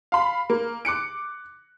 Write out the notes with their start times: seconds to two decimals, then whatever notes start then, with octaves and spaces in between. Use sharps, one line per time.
0.12 F5 B5
0.50 A#3
0.85 D6 F#6 C#7 D7